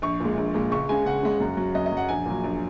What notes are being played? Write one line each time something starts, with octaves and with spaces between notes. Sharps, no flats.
A#1 C#6
A#2 G#3
A#1
A#2 G#3
C#2 C#6
C#3 G#3 G#5
C#2 F#5
C#3 G#3
F#2
F#3
F#2 D#5
D#5
F#3
F#5
A#1 G#5
A#2 F#3
A#1